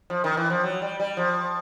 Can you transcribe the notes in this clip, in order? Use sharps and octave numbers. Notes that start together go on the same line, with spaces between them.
F3
D#3
E3
F3
F#3
G3
G3
F3